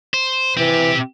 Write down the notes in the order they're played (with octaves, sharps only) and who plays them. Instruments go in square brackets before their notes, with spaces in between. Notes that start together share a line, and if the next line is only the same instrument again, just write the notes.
[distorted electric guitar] C5
[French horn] E3 [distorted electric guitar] C4 G4